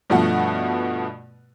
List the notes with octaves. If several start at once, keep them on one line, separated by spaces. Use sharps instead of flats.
G2 B2 F3 A3 F#4